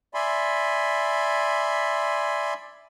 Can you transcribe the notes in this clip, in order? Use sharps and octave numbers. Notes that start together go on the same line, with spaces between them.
D5 E5 G#5 B5 C6